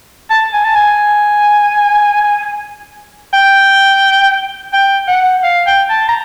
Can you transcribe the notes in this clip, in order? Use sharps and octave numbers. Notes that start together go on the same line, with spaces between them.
A5
G#5
A5
G#5
G5
G5
F#5
F5
G5
A5
A#5